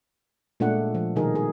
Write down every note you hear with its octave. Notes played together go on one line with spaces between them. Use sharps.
A#2 G#3 A3 D4 F#5
F3
B2 D#3 G3 D#4 G#4 A#4
G#4